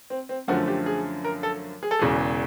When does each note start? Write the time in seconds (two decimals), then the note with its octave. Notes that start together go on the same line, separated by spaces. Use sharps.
0.10 C4
0.29 C4
0.48 F#2 D3 F3 A3 F#4
0.68 G4
0.86 G#4
1.24 A#4
1.43 A4
1.83 G#4
1.91 A4
1.99 E1 E2 C#3 G#4